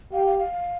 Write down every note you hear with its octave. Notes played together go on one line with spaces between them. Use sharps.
G4 F5
F5
F5